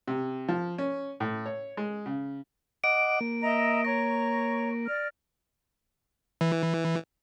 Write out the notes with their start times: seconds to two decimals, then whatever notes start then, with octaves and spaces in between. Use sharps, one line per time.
0.08 C3
0.48 F3
0.78 C#4
1.20 A2
1.46 C#5
1.77 G#3
2.06 C#3
2.84 D#5 F#5 D6 D7
3.21 A#3
3.42 D#5 E5 A#5
3.85 C#5 A#5 C#6 A#6
4.87 D5 F6
6.41 E3